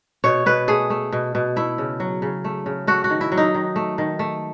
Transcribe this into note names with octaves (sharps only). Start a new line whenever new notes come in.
B2 C#5
B2 B4
A3 G#4
A3
B2
B2
A3 E4
C#3
F#3
C#3
A3
C#3
A3 F#4
F#4
D#3
E4
F#3
D#4
D#3
A3
D#3
A3